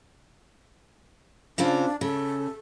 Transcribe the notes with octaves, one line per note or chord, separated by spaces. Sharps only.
C#3 C4 D4 F4
C#3 A4